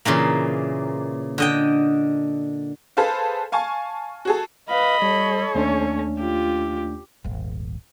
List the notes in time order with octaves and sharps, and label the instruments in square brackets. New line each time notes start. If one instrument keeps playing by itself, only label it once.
[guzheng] A#2 C#3 E3 A#3
D3 D#5 G5
[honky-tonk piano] G#4 A4 B4 C5 F5
F5 G#5 A5 C#6
F#4 G#4 A4
[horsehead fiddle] B4 F5 [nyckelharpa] D#5 B5
[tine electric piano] G3 [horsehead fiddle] A4 C#5
[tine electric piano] D#2 A3 D4 [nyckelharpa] C#4
[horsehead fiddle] F4 [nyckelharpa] G4
[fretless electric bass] D#1 G#1